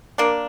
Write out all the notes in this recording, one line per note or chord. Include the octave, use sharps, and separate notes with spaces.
A#3 D4